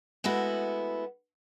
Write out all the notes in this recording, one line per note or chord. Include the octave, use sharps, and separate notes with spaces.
G#3 A3 B3 E4 F#4